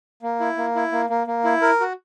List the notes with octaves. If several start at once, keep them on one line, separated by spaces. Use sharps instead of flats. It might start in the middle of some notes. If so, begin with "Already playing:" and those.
A#3
E4
A#3
E4
A#3
A#3
A#3
E4
A#4
F#4